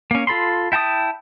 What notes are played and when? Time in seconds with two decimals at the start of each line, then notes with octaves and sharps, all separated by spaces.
0.11 A#3 C#4
0.27 F4 A4 B5 C6
0.72 E4 G5 A5 A#5 D#6